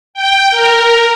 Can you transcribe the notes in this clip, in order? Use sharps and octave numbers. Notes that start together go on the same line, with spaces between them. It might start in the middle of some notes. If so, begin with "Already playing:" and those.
G5
A#4